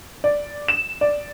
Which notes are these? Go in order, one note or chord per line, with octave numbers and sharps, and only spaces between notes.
D5
E7
D5